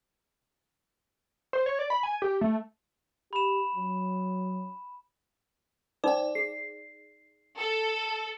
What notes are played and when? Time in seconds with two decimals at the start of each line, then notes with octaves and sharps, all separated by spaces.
1.53 C5
1.66 C#5
1.79 D5
1.90 B5
2.03 G#5
2.22 G4
2.41 A3
3.33 G4 B5 E7
3.75 F#3
6.04 D#4 C5 D5 G5 D6
6.35 G#4 C7
7.58 A4